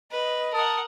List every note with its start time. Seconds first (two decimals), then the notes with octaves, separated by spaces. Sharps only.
0.11 B4 D#5
0.53 A#4 F#5 A5 D#6